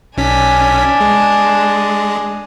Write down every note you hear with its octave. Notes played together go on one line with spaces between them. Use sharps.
B1 C#4 D4 G#5 B6
G#3